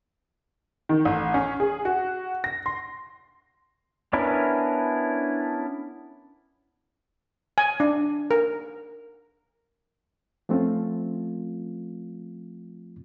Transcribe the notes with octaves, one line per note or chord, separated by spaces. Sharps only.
D#3
A1
C#4
G#4
F#4
A#6
C6
B3 C#4 D4 E4 A#4
G#5
D4
A#4
F3 A3 C4 C#4 F4